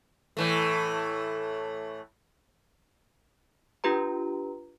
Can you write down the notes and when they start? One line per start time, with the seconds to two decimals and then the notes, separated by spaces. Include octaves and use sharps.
0.37 A2 E3 A3
3.84 D4 F4 G4 B4 A#5